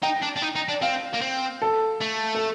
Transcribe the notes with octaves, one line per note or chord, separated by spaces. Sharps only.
D#4 G5
D4
D4
D#4
D#4
D4
C4 F5
A#3
C4
A4
A3
A4